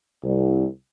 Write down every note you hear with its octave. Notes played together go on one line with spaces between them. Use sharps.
C2